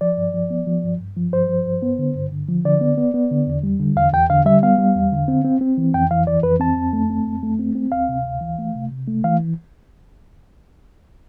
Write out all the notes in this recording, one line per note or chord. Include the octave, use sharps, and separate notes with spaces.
F3 D5
G2
F3
B3
F3
G2
G2
F3
G2 C5
F3
G2
B3
D3
G2
D3
F3
D3 D5
B3
B3
B3
D3
E2
G3
D3
E2 F5
E2 G5
D3 F5
G3 E5
B3 F5
G3
E2
D3
C4
C4
C4
E3
F2 G5
E3 F5
E3 D5
F2 B4
C4 A5
F2
A3
C4
F2
A3
C4
C4
D2 F5
C3
D2
E3
A3
C3
C3
A3
E3 F5